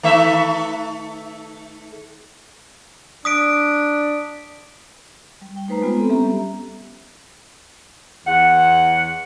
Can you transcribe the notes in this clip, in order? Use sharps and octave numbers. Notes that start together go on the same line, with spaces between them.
D#3 A3 E5
D4 D#6 B6 D7
G3
G5
A3 D#4 B4 C5 A#5
G#3 B3 F4 A#5
C4 A4
G3 B3 C#4 G4 E5 A#5
E2 F#5